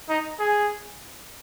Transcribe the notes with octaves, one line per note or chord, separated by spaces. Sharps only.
D#4
G#4